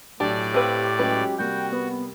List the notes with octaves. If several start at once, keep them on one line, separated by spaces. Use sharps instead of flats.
B1 A2 D4 G4 D5
C4 G4 B4 F5 E6 F6
F#3 G#3 C#4 B4
C3 G3 A#3 F#4 G5
B3